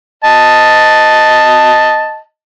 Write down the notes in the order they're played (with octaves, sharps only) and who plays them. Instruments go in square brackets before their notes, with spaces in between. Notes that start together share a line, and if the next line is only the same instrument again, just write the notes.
[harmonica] D#5 A5